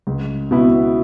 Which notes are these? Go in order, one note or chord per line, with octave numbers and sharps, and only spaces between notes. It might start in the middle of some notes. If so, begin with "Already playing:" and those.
C#2
B2 B3 E4